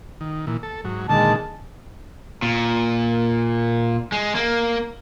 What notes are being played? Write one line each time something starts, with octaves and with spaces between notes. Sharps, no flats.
D#3
A#2 E3
A4
G#2 F#3
A#2 D3 D#3 G#3 A5
A#2
G#3
A#3